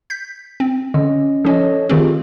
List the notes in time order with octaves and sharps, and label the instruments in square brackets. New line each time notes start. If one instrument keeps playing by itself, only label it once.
[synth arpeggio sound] G6 B6
C4
[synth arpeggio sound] D3 [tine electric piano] C#4 D#5
[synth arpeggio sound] F3 C#4 [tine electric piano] A4 C#5 D#5
[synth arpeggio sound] D#3 A3 C4 [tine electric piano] F4 G4 G#4